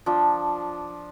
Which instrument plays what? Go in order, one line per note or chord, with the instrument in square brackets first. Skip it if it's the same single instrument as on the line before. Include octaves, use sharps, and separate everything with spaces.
[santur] F3 D4